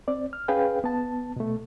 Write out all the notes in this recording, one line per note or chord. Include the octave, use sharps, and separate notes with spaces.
C4 D5
F6
C#4 G#4 B4 F5 G5
B3 A5
B2 A3